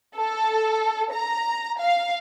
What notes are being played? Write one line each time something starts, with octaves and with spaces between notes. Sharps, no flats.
A4
A#5
F5